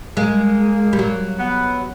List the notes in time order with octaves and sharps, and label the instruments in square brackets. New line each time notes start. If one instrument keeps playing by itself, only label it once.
[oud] G#3 [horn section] A#3
[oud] G3
F#3
[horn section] B3